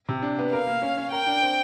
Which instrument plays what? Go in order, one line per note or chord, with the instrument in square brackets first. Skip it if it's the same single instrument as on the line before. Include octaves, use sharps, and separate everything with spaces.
[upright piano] C3
D4
B3
[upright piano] A#4 [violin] F5
[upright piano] A#3
C#4
C#4
[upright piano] A#4 [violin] G5
[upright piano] D4
C4